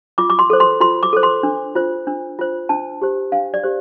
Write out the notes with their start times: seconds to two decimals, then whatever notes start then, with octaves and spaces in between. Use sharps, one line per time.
0.18 F4 D6
0.30 D6
0.39 C6
0.50 A4 C5
0.60 C6
0.80 F4 C6
1.03 D6
1.13 A4 C5
1.23 C6
1.43 D4
1.75 F4 C5
2.07 D4
2.39 F4 C5
2.69 D4 A5
3.02 G4 C5
3.32 D4 F5
3.54 D5
3.63 G4 C5